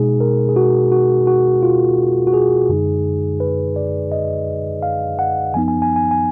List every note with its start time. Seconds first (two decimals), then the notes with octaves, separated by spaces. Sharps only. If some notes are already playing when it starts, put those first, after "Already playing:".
Already playing: B2 G#3 D#4 G#4
0.21 A#4
0.49 G#4
0.56 F#4
0.92 F#4
1.27 F#4
1.63 F4
2.27 F#4
2.34 G#4
2.69 F#2 D3 G#3 D#4
3.40 B4
3.76 D5
4.12 D#5
4.83 F5
5.19 F#5
5.54 F#2 F3 B3 D#4 G#5
5.68 G#5
5.82 G#5
5.96 G#5
6.11 G#5